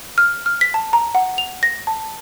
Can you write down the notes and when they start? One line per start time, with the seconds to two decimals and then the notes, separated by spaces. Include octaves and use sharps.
0.18 F6
0.46 F6
0.61 B6
0.74 A5
0.93 A#5
1.15 F#5
1.38 F7
1.63 A#6
1.87 A5